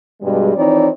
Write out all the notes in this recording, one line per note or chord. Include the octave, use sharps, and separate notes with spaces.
G2 B2 G3 G#3
E3 F3 C4 D#4 C#5 D5